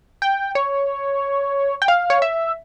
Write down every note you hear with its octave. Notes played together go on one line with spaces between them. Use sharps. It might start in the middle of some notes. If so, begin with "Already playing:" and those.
G5
C#5
G5
F5
C#5
E5